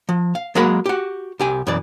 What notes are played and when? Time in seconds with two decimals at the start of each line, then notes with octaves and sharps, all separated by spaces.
0.09 F3
0.35 F5
0.55 F#3 G#3 A#3 A#4 F#5 B5
0.86 F#4 G4
1.40 C2 G4 G#5
1.67 F#2 B2 E3 D5